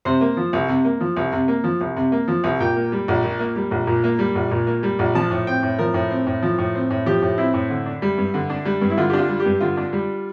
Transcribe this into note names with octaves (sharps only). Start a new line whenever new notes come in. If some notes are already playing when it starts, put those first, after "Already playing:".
C3 C5
A#3
F3
C2
C3
A#3
F3
C2
C3
A#3
F3
C2
C3
A#3
F3
C2
A#2 G5
A#3
G3
A#1
A#2
A#3
G3
A#1
A#2
A#3
G3
A#1
A#2
A#3
G3
A#1
F3 A5
A2
C4 G5
A2
F3 A#4
A2
C4
A2
F3
A2
C4
A2
F3 G4
A2
C4 E4
A2
D3
D4
G3
G2
D3
D4
G3
G2
E4
D3 F4
D4 G4
F4
G3
G4
G2
D3 F4
D4
G3